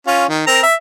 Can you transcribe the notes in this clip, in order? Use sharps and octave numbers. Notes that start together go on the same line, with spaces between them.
C#4 F4
D#3
C4 A#4 A#5
E5